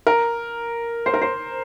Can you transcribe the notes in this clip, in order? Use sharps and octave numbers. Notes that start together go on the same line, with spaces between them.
A#4
C5
A#4
C5